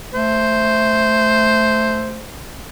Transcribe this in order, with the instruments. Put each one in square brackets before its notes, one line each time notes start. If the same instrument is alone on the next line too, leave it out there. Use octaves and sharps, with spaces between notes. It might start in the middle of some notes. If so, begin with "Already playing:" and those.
[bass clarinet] A3 [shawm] C5